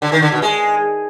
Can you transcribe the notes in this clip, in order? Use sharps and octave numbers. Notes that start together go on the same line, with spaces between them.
D3
D#3
D3
B2
G#3